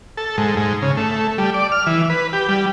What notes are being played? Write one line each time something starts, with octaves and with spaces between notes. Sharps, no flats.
A4
G#2
G#2
C#3
A3
G3
D5
F6
E3
B4
G4
G3